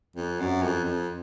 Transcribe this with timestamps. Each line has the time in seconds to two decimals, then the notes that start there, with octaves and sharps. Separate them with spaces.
0.16 F2
0.40 F#2
0.62 F2
0.84 F2